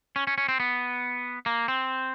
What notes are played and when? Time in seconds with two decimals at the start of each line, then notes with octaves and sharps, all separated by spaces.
0.16 C#4
0.27 C#4
0.38 C#4
0.49 C4
0.60 B3
1.46 A#3
1.68 C4